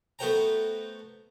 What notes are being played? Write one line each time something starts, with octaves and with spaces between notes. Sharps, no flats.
A3 B3 F#4 C5 G5 A#5